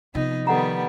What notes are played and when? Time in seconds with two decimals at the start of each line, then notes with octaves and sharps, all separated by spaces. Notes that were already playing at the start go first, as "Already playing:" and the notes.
0.15 C3 F3 B3 D#4
0.47 D#3 G3 B3 A4 F#5 A#5